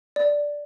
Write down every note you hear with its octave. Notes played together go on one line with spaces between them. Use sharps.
D5